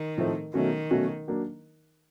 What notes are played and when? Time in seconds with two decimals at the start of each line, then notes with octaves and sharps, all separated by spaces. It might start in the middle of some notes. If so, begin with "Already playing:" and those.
Already playing: D#3
0.17 A2 F3 A3 C4 D#4
0.54 B2 D#3 F#3 A3 C#4 F#4
0.91 B2 F#3 A3 C#4 F#4
1.28 F#3 A#3 D4